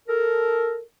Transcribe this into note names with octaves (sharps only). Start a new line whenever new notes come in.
A4 A#4